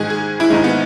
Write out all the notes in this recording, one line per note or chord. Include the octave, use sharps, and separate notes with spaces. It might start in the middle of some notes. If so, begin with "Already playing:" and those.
Already playing: G#2 D#3 G#3 G#4
G#4
E4
G#2 D#3 G#3 D#4
B3